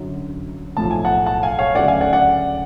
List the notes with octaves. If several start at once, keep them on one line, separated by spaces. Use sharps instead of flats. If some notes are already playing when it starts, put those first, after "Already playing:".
Already playing: F#2 D3 F#3
B1 A2 F3 A3 A5
G#5
F#5 A5
F#5 A5
F5 G#5
C#5 F5
D2 C#3 F#3 A3 D5 F#5
F5 G#5
D5 F#5
D5 F#5